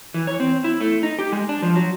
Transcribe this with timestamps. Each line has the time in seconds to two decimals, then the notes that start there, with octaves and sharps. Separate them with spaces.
0.14 E3
0.27 C#5
0.40 C4
0.64 E4
0.81 A3
1.03 D#4
1.19 G4
1.32 G#3
1.49 D4
1.62 F3
1.75 F#3